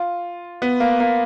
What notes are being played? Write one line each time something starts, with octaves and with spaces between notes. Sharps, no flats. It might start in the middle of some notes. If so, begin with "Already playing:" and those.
Already playing: F4
B3
A#3
A#3